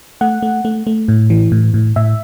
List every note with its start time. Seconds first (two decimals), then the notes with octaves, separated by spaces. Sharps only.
0.21 A3 F#5
0.42 A3
0.65 A3
0.87 A3
1.08 A2
1.30 E3
1.52 A2
1.74 A2
1.96 A2 E5